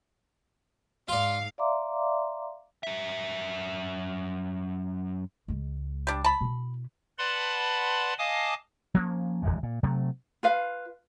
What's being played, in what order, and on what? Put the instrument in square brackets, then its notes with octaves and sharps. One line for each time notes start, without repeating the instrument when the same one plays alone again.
[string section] G#2 F5 [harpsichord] F4 D5
[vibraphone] D5 E5 F5 A#5 C6 D6
[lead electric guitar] F#2 E5
[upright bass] C#2 G#3
[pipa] G3 D4
A5 B5
[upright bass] B2 E4
[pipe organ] B4 D5 F#5 A5 B5 C6
D#5 F5 G#5 A5 D6 D#6
[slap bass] F3 A#3 C#4
D1 G1 E3 G#3
A#2
C3 F#3 A3
[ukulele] F4 B4 F5